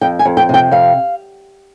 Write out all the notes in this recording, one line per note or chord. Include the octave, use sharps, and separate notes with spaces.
F2 G5
G#5
F2
G5
C3 G5
F2 F5